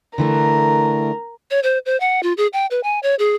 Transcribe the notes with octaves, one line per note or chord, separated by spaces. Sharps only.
D3 E3 A3 A#4
C#5
C5
C5
F#5
F4
G#4
G5
B4
G#5
C#5
G#4